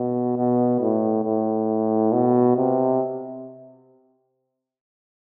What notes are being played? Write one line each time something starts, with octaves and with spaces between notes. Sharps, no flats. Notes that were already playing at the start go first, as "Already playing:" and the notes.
Already playing: B2
B2
A2
A2
B2
C3